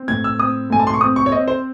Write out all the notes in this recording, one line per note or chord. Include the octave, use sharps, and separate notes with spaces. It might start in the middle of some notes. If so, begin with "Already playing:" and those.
Already playing: C4
A2 G#6
E6
C4 D#6
A2 G#5
A5
C6
C#6
C4 D#6
C#6
C#5
C4 D#5
C5